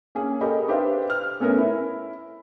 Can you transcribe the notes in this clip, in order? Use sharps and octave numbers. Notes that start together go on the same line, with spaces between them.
A#3 C#4 G#4
G4 A4 A#4 D#5 B5
D4 G4 B4 C5 E5 F5
F6
A3 B3 C#4 A4 A#4 G#5
E4